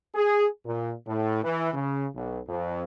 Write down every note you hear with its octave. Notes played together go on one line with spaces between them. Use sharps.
G#4
A#2
A2
E3
C#3
B1
F2